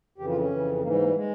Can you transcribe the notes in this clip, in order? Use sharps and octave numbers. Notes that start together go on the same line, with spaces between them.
F2 C#3 E3 G4
F4
C#4
F2 C#3 E3
G#2 E3 A#3
G3
A#3
G3
G#3